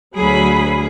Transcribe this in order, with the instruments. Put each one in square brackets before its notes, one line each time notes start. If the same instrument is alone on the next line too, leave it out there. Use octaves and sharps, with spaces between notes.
[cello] D2 G#4 [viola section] F#3 B5